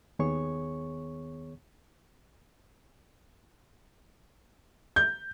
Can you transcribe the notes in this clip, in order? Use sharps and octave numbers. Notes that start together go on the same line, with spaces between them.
D#2 D#3 B3 G#4 C#5 C#6
G6